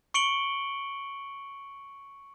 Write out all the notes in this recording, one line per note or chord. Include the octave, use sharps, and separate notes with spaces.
C#6 C#7 D7 F#7 G7